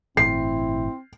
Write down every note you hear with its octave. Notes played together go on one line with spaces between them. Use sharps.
G1 A2 E3 C4 E4 C7